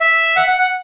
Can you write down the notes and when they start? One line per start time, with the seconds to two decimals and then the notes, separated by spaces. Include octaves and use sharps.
0.01 E5
0.36 F#5
0.48 F#5
0.59 F#5